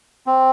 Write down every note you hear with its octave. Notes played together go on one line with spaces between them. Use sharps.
C4